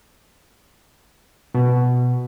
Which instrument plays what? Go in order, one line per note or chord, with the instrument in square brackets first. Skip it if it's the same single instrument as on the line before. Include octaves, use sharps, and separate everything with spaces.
[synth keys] B2